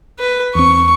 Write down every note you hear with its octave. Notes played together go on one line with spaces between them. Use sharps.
B4
E2 C4 C#6